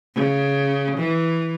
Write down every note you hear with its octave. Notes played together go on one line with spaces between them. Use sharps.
C#3
E3